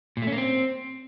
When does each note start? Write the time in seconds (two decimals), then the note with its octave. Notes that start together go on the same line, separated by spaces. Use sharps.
0.17 A#2
0.22 A3
0.27 C#4
0.32 A#3
0.37 C4